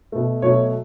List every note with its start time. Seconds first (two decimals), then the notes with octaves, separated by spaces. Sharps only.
0.12 B2 A3
0.42 B2 F#3 A3 C#5